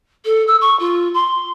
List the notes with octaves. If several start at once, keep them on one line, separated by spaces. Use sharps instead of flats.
A4
E6
C#6
F4
C6